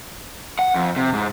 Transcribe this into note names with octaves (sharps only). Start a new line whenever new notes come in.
F#5
F2
C3
G#2